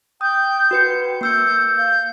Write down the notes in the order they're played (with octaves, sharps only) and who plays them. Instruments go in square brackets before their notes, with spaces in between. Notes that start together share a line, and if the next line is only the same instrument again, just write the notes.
[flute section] G5 G6 [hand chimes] D#6
[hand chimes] F#4 B4 C#7
[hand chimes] A#3 E6 C#7 [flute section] G6
[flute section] F5 G6